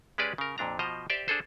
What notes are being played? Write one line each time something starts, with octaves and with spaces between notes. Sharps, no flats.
G#3 C#4 G4 G#4 B4 D5
C#3 A#4
F2 A#2 D4 A#5
B2 F3 C5 D#5 A#5
G4 C5 D5 E5 G5
D4 G#4 A4 C5